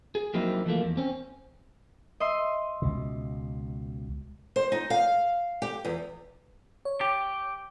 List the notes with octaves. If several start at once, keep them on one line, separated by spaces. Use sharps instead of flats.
G#4
F3 F#3 A#3 C4 D#4 E4
E3 F3 A3 A#3
E2
C4 C#4
D#5 E5 C6
C#2 B2
C5
D#4
F5
G4
E2
C#5
G4